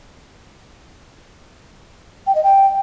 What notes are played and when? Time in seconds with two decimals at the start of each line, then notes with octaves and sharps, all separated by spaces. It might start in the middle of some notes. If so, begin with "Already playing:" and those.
2.27 G5
2.35 D#5
2.44 G5